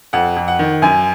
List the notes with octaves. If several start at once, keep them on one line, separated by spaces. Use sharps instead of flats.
F2 F#5
F2
F#5
D#3
F#2 G#5